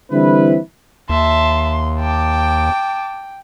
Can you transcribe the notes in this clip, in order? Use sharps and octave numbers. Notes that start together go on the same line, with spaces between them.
D3 E3 G3 C4 E4 B4
D#2 E5 A5 C6
G5 A5 D6